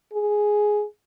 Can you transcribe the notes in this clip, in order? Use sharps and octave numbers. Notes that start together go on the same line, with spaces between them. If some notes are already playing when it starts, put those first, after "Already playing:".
G#4